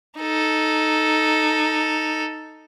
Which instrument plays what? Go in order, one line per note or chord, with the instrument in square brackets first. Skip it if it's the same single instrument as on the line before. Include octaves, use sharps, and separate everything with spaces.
[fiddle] D#4 A4